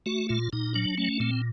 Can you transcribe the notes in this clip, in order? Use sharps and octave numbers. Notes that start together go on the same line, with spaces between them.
A3 F#4
A#2 F4
A#2 D#4
F#3 D4
A3 C#4
A#2 C4